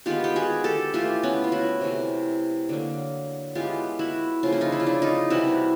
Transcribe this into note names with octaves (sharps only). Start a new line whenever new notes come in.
D#3 G#3 B3 F4 G4
G4
F#4 G#4
G4 A4
E3 A3 F4 G4
B3 C#4
F4
E4 F#4
C3 E3 A3
D3 F#3 A#3
E3 G#3 B3 F4 G4
E4 F#4
C#3 F3 A#3 F4
E4
D#4 F4
E4
F4
D4 E4
D#4 F4
C3 E3 G3 E4 F#4